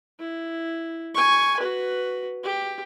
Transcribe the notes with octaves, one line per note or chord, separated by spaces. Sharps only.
E4
G#5 C#6
F#4 B4
G4